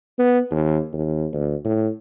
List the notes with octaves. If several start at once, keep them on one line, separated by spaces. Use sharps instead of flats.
B3
D#2
D#2
D2
A2